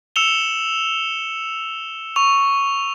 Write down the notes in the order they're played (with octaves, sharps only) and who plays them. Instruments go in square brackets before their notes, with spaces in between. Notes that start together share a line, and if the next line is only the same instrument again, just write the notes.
[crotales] E6 C#7 E7 F7 G7
C#6 F7